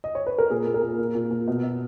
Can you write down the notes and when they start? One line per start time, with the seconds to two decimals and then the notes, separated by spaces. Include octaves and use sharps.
0.04 D#5
0.15 C#5
0.27 B4
0.38 A#4
0.50 A#2 G#4
0.67 A#2
0.74 A#4
0.82 A#2
0.98 A#2
1.15 A#2
1.31 A#2
1.48 B2
1.64 B2